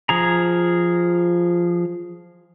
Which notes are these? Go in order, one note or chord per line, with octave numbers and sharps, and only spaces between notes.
F3 G#4 A#5